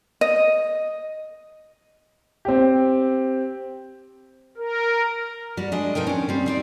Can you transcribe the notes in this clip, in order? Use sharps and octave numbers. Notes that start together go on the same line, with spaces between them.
D#5
C4 G4
A#4
G3 F#4
G#3 D4 D#5
B2 F3 D#4 A#4 G5
C#4 D4
G3 C4
C4 D#4 D5